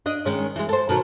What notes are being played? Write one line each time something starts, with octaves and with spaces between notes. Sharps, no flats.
D4 D#5
D#3 G#3 C#4
E3 G#3
A4 C5
B2 D#3 F#3